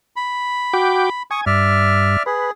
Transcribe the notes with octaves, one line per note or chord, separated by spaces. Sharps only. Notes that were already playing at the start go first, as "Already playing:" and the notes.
B5
F#4 G5 D6
G#5 C#6 D#6
G2 D5 E5 F6
G#4 B4